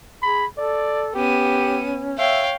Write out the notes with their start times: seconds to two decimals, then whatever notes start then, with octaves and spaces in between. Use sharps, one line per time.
0.23 G#4 B5
0.58 A4 D5
1.15 B3 C#4 G4 D#7
2.18 C#5 E5 F5 G5